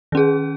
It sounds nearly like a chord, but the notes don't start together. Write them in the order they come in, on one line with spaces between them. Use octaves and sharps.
D#3 C#4 G#4